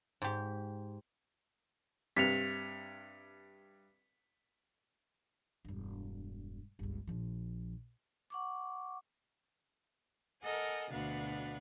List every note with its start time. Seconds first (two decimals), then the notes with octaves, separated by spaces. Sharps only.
0.22 G#2 G4
2.16 G2 C3 B6 C#7 F7
5.65 E1 G2
6.79 G1 C#2
7.07 A#1 F3
8.30 F#5 C#6 D6
10.41 A4 A#4 D#5 F#5 G#5
10.90 D2 B2 D4 B4 F5 F#5